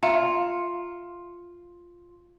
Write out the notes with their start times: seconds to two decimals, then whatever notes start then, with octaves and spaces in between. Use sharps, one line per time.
0.03 F4 E5 G5 A#5